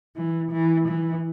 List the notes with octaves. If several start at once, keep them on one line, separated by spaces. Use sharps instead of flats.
E3
E3
E3